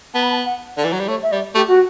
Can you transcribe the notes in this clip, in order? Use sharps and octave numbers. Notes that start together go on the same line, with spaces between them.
B3 A5
B5
A5
F#5
D3 D5
E3
F#3
G3
A3 C#5
E5
G3 D5
A3 G4
F#4